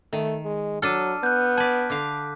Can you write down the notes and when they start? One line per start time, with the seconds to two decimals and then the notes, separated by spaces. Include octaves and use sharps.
0.13 D#3 A3
0.45 G#3
0.82 F#3 D4 A4 F6 D#7
1.23 B3 F#6 G6
1.57 D5 G#5 A5 B6
1.90 D3 F5 D6